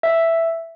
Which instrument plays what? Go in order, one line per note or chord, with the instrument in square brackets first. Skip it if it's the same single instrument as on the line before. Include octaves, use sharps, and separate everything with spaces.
[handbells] E5